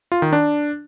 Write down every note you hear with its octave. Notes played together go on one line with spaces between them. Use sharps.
F4
D#3
D4